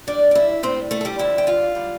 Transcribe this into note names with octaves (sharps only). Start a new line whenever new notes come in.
A2 G3 D4 D5
D5
E4 E5
A2 G3 C4 C5
A3 A4
A4
G3 G4
F2 D3 G3 E4 E5
G5
F4 F5
D3 G3